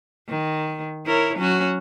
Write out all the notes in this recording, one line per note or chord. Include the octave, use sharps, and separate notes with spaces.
D#3
E4 A#4 C#5
F#3 C#4 F#4